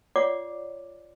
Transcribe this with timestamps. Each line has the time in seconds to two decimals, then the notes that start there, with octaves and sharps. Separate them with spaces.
0.16 F4 C#5 D5 F#5 D6